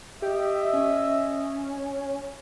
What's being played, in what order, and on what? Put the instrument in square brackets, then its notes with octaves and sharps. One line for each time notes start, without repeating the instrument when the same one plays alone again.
[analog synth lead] G4 [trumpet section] D#5 E5
[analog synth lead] C#4